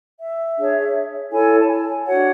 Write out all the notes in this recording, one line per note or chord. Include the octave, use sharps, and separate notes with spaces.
E5
D4 G#4 C#5
E4 A4 C#5 G#5
A5
G#5
D4 F#4 C#5 F#5